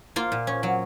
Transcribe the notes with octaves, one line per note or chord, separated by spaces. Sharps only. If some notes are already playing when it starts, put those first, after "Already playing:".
A#3 F4
A#2
C#4
F#3